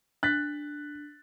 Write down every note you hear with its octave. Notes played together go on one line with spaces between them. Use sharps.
D4 F#6 A6 B6